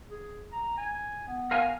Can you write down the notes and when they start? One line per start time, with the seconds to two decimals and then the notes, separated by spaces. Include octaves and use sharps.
0.11 G#4
0.52 A#5
0.77 G#5
1.27 B3
1.51 A#4 F5 G#5